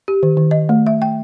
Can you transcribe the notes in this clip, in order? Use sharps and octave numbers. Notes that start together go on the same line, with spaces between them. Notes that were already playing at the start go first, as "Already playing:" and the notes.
G4
D#3
D#3
D#5
A3
E5
G5